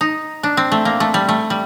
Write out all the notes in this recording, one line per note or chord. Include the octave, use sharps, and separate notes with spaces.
D#4
D4
C4
A3
A#3
A3
G3
A3
G3